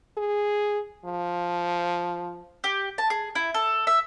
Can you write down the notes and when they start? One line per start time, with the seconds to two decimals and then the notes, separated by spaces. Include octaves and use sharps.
0.18 G#4
1.05 F3
2.64 G4
2.98 A5
3.10 G#4
3.35 E4
3.54 A4
3.87 E5